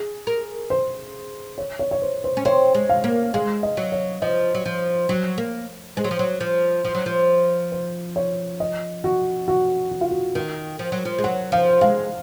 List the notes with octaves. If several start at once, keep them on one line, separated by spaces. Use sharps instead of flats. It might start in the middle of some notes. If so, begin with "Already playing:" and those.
Already playing: G#4
A#4
C5
C#5
C#5
C#5
C5
C5
C#4
C4 C#5
G#3
F5
A#3
G#3 F5
D#5
F#3
C#5
F3 D#5
F#3
F3
F#3
A#3
G#3 C5
F#3
F3
F#3
F3
F3
F#3
F3
C5
C#5
D#5
F#4
F#4
F#4
F4
F#4
D#3 A#4
F3
F#3
F3
G#3
F#3 F#5
F3 F5
G#3 F5